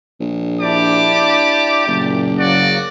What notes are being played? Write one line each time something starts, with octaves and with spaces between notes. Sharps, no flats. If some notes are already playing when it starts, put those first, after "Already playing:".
A#1
D4 E4 G4 D5 A5 D6
F#1 A#2
C#3 F#3 A#3 F#4 D5